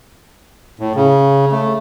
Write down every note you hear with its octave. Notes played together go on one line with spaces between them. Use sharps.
A2
C#3
A3